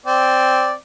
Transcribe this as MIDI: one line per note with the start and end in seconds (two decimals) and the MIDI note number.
0.06 0.72 60
0.06 0.72 74